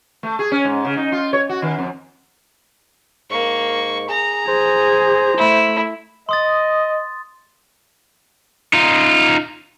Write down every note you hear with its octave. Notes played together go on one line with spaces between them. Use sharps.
A3
G#4
C#4
G#2
C#3
D#4
F4
C#5
F#4
D#3
F2
G#2 A#3 C#6
G#4 A#5
G#4 C5
A3 E4
D#5 C6 D#6 A6
D#4 F4